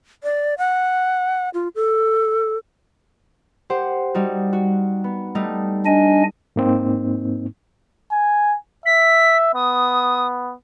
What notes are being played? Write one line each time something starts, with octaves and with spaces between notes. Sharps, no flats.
D5
F#5
F4
A4
G4 C5 F#5
G3 D#4 F#4
F#4
B3
G3 A3 D#4
D4 D#5 G#5
G#2 A#3 C4 D#4
G#5
E5 B6
B3 D#6